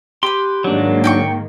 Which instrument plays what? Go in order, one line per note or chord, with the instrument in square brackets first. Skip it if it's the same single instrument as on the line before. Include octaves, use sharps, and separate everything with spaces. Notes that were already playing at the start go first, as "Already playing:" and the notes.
[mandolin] G4 B4 [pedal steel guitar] C6
[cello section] G#2 D#3 A#3 [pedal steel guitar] F#3 D4
[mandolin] G5 G#5 C#6